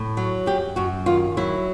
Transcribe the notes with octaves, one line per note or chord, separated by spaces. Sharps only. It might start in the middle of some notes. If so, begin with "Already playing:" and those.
Already playing: A2
F#3
F#2 G4
F#2 F#4
D#3 F4
F#3 E4